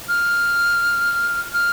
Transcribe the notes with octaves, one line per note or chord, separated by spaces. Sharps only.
F6
F6